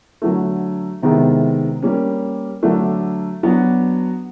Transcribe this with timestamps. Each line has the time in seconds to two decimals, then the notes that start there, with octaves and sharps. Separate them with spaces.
0.22 D3 F#3 A3
1.02 C3 D#3 G#3 B3 E4
1.82 G3 A#3 C#4
2.63 D3 F#3 A3 D4
3.43 F#3 B3 D4 F#4